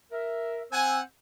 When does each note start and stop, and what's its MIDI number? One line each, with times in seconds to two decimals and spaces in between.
0.12 0.63 70
0.12 0.63 76
0.71 1.01 60
0.71 1.01 72
0.71 1.00 78
0.71 1.00 80
0.71 1.01 88